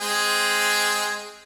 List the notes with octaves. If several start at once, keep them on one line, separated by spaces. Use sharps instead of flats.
G#3 C4 G#4